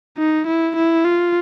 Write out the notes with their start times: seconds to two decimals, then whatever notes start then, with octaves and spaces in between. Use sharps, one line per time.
0.18 D#4
0.47 E4
0.76 E4
1.05 F4